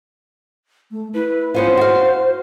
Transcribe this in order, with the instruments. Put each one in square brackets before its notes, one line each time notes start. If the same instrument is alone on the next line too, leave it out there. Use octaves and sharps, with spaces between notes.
[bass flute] A3
[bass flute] E4 [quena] B4
[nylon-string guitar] B3 C#4 F4 [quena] C5
[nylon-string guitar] F#4 F5